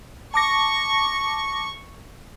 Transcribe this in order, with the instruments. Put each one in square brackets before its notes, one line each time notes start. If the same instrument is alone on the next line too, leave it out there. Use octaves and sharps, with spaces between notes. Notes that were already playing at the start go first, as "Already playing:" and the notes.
[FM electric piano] A5 D6 A#6 [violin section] C#6